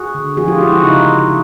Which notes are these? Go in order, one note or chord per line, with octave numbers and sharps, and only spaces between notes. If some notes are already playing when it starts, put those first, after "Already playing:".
Already playing: F#4 G#4
D3
F3 F#4 G#4
F4 G4
G#3 E4 F#4
E4 F#4
C#3 D#4 F4
C#3